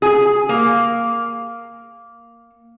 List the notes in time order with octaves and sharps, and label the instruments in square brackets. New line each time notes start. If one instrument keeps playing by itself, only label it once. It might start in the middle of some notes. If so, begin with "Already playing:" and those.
[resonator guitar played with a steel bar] G#4
A#3